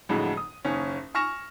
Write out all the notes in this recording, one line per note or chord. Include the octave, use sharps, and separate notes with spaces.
F2 A2 D3 F#3 G#3
D#6
F#1 D#2 C#4
G#5 C#6 F6 A#6 E7